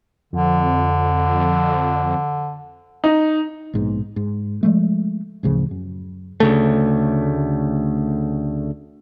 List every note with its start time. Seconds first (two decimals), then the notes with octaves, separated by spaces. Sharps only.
0.33 F2 D3
3.04 D#4
3.73 A#1 G#2 B2
4.16 G#2
4.63 F3 G#3 A3
5.43 A1 D2 C#3 F3
5.71 F#2
6.40 D2 C#3 A3